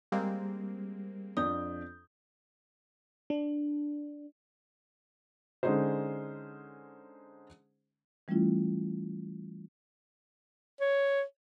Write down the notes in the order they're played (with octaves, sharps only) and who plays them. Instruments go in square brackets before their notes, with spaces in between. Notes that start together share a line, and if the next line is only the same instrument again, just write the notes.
[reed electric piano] G3 [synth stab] G#3 A#3 C4
[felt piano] F2 D4 G6 [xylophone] D#6
[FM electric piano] D4
[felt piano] D3 G#3 C#4 D#4 G#4 C5
[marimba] E3 G3 A3 C#4 E4 F4
[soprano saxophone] C#5